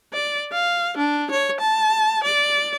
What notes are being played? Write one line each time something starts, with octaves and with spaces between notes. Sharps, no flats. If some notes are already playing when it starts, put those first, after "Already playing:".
D5
F5
D4
C#5
A5
D5